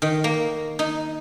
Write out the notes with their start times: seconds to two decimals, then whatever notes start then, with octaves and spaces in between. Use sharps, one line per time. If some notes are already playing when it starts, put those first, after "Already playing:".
0.02 D#3
0.24 A#3
0.79 D#4